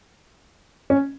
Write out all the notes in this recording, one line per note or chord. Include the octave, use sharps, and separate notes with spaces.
C#4